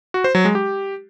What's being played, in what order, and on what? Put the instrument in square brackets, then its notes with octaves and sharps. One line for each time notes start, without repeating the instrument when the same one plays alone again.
[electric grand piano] F#4
C5
F#3
G#3
G4